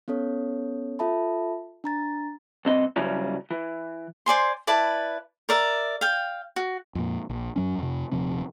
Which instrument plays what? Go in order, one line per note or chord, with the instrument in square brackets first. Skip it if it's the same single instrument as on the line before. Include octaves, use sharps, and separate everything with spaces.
[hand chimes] B3 C#4 A4 C#5
F4 A4 E5 A5 B5
D4 A#5 A6
[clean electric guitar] C2 C4 D#5
G2 C#3 F#3 G3 C#4 E4
E3
[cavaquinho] C5 D5 G#5 C6
E4 B4 D5 A5
A#4 D5 E5
F5 G5
F#4
[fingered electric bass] F2 A#2
A#1
F#2 F#3 C#4
F2 C3
D#1 C3 F3 C4